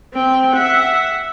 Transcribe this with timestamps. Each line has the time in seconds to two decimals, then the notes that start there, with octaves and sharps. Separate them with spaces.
0.14 C4 G5
0.53 E5 F#5